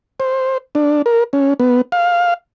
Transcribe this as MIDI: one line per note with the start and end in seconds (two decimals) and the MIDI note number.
0.20 0.58 72
0.75 1.02 62
1.06 1.24 70
1.33 1.54 61
1.60 1.81 59
1.92 2.34 77